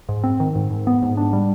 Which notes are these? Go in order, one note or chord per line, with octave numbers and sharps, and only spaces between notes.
G#2
C4
D#3
G#2
G#2
B3
G#2
D4
G3